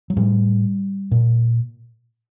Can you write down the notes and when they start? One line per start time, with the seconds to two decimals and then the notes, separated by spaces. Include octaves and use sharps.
0.10 F#3
0.17 A2 G3
1.11 A#2